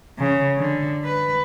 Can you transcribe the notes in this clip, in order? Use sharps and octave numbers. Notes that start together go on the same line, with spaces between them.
C#3
D3
B4